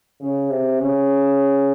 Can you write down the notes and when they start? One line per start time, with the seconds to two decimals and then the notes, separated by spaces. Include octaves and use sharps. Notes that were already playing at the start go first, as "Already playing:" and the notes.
0.20 C#3
0.50 C3
0.79 C#3